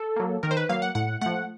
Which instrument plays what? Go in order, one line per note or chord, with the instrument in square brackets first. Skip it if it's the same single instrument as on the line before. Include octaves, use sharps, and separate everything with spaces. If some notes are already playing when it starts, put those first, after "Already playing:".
Already playing: [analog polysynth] A4
F#3 A#3
D#3 A#4
C5
B4
F#3 A#3 F5
F#5
A2 F#5
F3 A3 F#5